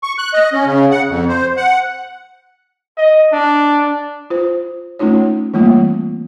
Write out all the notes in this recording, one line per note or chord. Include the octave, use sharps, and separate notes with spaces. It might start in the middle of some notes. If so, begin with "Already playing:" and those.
C#6
F#6
D#5
C#4
C#3
F#5
F2
C5
F#5
D#5
D4
F4 C5
A3 C#4 D#4 F4 C#5
E3 G3 A3 A#3 C4 F4